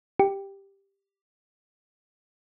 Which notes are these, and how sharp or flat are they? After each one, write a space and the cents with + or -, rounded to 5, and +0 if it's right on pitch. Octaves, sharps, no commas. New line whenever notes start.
G4 +5